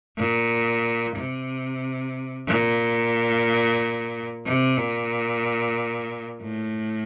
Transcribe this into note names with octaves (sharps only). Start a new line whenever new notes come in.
A#2
C3
A#2
C3
A#2
A2